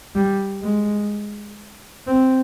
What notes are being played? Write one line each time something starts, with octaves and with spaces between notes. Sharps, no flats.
G3
G#3
C4